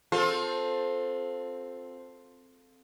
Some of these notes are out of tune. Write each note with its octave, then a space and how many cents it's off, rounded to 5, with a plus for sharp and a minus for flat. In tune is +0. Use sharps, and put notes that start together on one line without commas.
C4 +0 F4 +25 A4 +0